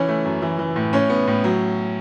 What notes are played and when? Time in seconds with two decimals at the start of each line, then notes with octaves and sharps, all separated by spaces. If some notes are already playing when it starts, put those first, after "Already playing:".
Already playing: E3 C#4 C#5
0.08 A3
0.25 F#2
0.42 E3
0.59 E3
0.76 A2
0.93 A2 C#4 C#5
1.10 B3
1.27 A2
1.44 F#3